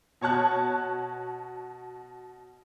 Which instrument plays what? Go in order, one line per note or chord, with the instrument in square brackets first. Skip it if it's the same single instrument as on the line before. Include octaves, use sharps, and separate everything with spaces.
[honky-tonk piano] B2 C#5 A5 F#6